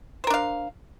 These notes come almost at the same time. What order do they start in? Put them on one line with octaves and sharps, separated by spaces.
C5 A#4 D4 F5